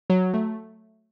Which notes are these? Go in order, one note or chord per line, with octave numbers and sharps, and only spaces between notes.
F#3
A3